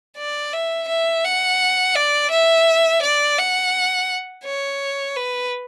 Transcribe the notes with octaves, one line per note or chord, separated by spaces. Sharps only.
D5
E5
E5
F#5
D5
E5
D5
F#5
C#5
B4